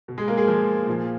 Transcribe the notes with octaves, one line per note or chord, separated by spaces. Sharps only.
B2
G#3 G#4
A#3 A#4
G#3 G#4
F3 F4
A#2 F3